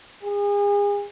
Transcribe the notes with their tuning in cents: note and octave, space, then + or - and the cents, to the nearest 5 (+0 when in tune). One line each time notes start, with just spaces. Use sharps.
G#4 -35